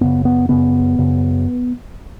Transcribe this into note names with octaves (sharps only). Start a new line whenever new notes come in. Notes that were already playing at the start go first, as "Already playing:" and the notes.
F#2 C#3 B3
B3
F#2 C#3 B3
F#2 C#3